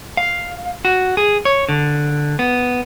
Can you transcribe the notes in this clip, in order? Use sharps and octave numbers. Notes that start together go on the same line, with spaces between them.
F5
F#4
G#4
C#5
D3
B3